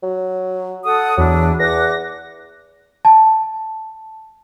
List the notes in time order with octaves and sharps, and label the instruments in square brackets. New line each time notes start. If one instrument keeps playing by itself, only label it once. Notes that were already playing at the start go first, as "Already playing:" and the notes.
[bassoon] F#3
[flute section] A4 F#5 D#6
[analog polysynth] E2 [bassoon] F#3 [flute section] D4 E4
[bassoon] E2 [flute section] F#5 D6 F#6 [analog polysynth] A#6
[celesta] A5